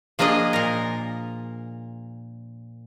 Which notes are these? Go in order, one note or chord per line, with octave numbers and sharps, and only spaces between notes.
F3 A#3 D4 G#4 D#5
A#2 A#4